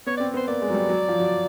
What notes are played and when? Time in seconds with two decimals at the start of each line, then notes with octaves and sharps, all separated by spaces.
0.06 B3 C#5
0.17 C4 D5
0.34 B3 C5
0.47 A#3 D5
0.62 G#3
0.70 F#3
0.74 G3
0.89 F#3
1.08 F3
1.19 F#3